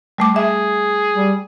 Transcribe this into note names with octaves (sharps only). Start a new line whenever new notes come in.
G3 A3 D6
G#4 E5
G3